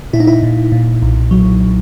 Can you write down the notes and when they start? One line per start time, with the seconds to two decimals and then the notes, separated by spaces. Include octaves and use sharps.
0.13 A#2 E4
0.20 D#4
0.27 E4
0.43 A#2
0.72 A#2
1.02 B1
1.31 F#3